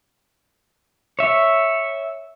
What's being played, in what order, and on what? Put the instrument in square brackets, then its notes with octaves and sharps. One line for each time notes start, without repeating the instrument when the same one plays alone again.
[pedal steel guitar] C#5 E5